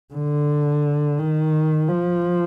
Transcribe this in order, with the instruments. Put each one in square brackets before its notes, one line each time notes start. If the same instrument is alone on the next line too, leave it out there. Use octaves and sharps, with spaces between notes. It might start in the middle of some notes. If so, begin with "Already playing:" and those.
[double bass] D3
D#3
F3